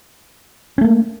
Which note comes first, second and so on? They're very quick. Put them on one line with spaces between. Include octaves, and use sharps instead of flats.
C#4 A3 A#3